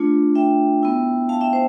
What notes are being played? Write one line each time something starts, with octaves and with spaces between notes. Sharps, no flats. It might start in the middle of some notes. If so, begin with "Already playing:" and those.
Already playing: A3 D4 F4
E5 G5
B3 E4
F5 A5
E5 G5
C5